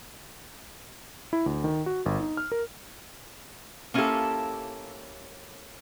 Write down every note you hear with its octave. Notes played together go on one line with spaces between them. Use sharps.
E4
D2
D#3
F#4
G1
D#4
F6
A#4
A#3 C#4 E4 F4 G4 A4